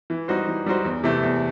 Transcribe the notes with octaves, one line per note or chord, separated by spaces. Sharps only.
E3
G3 D#4 F#4 C5
E3
G3 D#4 F#4 C5
E2
C3 E3 A3
E2